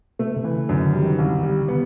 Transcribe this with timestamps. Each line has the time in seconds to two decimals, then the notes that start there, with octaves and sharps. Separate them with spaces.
0.19 C3 A3
0.36 C3
0.44 E3
0.53 C#3
0.69 F#2 D3
0.86 D#3
0.94 G3
1.02 D#3
1.18 C2
1.43 G3
1.68 B3